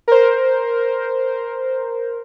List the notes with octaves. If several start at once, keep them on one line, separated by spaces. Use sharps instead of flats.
A#4 C5